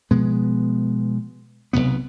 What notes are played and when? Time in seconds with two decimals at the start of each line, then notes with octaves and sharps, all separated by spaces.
0.11 B2 F3 G#3 B3
1.73 B1 G#2 C3 B3